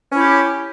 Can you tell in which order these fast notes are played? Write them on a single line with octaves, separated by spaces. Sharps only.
C#4 E4 G4